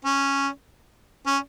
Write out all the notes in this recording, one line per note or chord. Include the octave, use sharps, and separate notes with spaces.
C#4
C#4